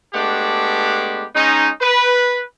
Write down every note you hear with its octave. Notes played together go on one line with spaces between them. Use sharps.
G#3 A3 B3 D4 G4
G#3 C#4 D#4
B4